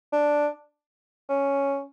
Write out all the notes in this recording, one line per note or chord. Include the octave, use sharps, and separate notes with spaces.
D4
C#4